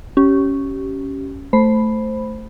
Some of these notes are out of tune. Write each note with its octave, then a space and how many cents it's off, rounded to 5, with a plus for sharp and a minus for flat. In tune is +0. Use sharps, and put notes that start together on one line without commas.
C#4 +0 G4 -25
A3 +0 C5 +0 B5 +0